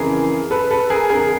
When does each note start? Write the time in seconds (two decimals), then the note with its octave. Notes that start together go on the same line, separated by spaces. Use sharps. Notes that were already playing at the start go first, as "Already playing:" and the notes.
Already playing: F2 C#3 E3 G#4 A#4
0.51 A4 B4
0.71 A4 B4
0.90 G#4 A#4
1.09 F2 D3 G#4 A#4